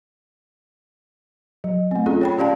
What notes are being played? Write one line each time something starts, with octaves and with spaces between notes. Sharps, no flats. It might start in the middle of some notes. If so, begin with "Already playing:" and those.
F#3
A3 C4
C#4 F4 G#4 A4
C#5 G5 B5
C#4 G4 D5 F5 A5